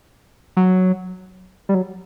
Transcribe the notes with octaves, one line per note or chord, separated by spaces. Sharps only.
F#3
G3
F#3